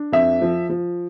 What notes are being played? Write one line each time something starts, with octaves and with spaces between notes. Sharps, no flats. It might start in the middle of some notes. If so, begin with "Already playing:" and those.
Already playing: D4
F2 E5
F3
F3